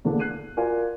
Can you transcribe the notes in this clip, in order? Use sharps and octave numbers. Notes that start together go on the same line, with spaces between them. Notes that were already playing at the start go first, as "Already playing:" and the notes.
E2 D3 A#3 D4
F#6 C7 D#7
F4 F#4 A#4 D5 F5 G#5